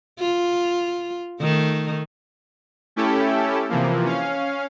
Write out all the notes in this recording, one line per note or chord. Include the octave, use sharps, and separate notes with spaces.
F4
D#3 A3
A3 C#4 E4 G4 A4
C3 E3 F3 A#3
C#4 F5